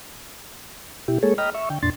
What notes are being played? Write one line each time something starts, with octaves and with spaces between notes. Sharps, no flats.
B2 E4 G4
G#3 A#3 G#4 A4 C#5
D#5 G5 A#5 B5 F6
E5 C#6
D3 G5
F2 A#2 D4 C6 A6